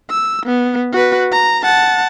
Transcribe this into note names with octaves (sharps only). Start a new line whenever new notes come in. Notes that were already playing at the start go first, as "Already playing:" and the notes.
E6
B3
F#4 B4
A#5
F#5 A5